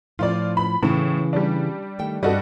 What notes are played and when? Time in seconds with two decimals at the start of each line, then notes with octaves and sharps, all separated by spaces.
0.19 A2 F3 F4 D5
0.57 B5
0.83 A2 C#3 E3
1.33 G3 D4
1.99 D#3 A3 G5
2.23 G2 G3 F#4 A4 D5 D#5